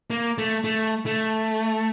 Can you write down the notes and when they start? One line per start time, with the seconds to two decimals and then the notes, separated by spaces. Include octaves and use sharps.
0.10 A#3
0.38 A3
0.64 A3
1.06 A3